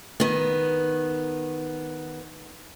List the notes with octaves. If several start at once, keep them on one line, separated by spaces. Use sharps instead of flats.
D#3 B3